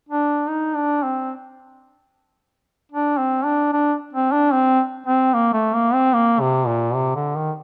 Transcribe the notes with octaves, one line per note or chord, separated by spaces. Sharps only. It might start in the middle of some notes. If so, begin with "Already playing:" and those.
D4
D#4
D4
C4
D4
C4
D4
D4
C4
D4
C4
C4
A#3
A3
A#3
C4
A#3
C3
A#2
C3
D3
D#3